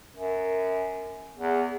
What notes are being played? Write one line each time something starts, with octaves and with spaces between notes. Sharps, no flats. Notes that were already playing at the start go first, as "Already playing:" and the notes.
F#2
E2